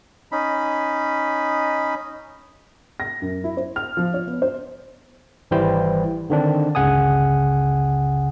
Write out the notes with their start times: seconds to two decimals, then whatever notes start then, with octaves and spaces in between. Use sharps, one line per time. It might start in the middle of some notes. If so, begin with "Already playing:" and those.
0.32 C#4 D#4 B5
3.00 A#6
3.22 F#2
3.44 E4
3.57 C5
3.76 F6
3.97 F3
4.14 C#5
4.27 B3
4.42 C5
5.51 G#1 E3 G3 E4 C5 G5
6.30 D3 D#3 C4 D4
6.75 G1 C#2 C#3 F#5 G#5 D#6